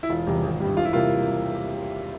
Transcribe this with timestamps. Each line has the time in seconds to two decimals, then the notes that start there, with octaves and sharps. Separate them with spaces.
0.03 E4
0.09 E1 F4
0.27 E2 C3 G3
0.43 G#1
0.60 G2 G3
0.76 E1 F4
0.85 E4
0.93 C3 G3 A#3 F4